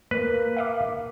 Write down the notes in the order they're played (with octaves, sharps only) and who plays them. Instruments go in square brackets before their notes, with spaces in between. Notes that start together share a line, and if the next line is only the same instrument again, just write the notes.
[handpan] A#3 [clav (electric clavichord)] B4
[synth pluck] E5 F5 D6